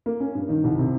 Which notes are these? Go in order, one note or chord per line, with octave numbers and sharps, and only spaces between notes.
A#3
C#4
G2
D#3
C2
C3